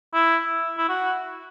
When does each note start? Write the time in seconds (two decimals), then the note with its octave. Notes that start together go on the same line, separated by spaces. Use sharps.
0.14 E4
0.78 E4
0.89 F#4